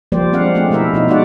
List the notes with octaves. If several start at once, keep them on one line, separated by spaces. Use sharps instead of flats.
F3 G3 A#3 G4 C5 D5
G#3 C4 D4 F5 F#5
G#3 A3 C4 C#4 G4 G#4
B2 A3 E4 F4 A#4 E5
B2 D#4 F4
G#3 D#4 F4 F#4 D5 F#5